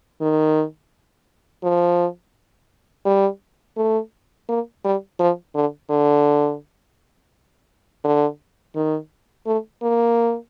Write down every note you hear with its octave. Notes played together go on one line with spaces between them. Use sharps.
D#3
F3
G3
A3
A#3
G3
F3
D3
D3
D3
D#3
A3
A#3